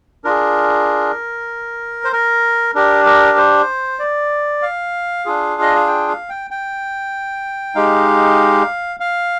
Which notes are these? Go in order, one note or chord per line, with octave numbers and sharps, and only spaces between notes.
D4 F4 G#4 A#4
C5
A#4
D4 G4 A#4
A#4
C5
D5
F5
D4 F4 G#4
D#5
F5
G5
F5
G5
G5
G#3 D#4 G4 F5
F5